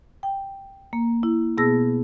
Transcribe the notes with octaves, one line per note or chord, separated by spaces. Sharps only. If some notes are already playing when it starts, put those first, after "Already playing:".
G5
A#3
E4
B2 B3 G#4 A5 E6 A#6